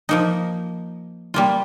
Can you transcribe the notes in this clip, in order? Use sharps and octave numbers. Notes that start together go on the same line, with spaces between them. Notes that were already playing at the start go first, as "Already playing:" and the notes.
F3 A#3 D#4
G3 A#3 F4